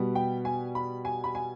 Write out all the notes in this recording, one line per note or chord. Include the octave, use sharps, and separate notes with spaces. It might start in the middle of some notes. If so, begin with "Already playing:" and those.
Already playing: B2 G3 B3
G5
G#5
B5
G#5
B5
G#5